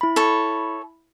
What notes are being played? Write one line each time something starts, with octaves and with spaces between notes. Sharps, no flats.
E4 B5
A4 C#5